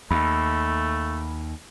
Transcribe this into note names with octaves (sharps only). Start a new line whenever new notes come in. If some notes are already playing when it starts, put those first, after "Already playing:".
D#2 A3 B5